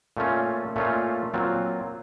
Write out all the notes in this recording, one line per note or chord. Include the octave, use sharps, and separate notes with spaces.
A#2 A3 C#4 F4
A#2 A3 C#4 F4
A#2 F#3 C4 F4